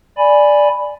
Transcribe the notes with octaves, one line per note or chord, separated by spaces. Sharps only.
D5 G#5 B5